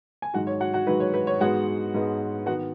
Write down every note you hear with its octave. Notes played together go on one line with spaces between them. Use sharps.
G#5
G#2 D#3 F#3 F#4 F#5
C#5
F#4 F#5
F#4 F#5
G#2 D#3 F#3 B4
C#5
B4
C#5
G#2 G#3 B3 F#4 F#5
G#2 G#3 B3
D#3 B3 F#4 F#5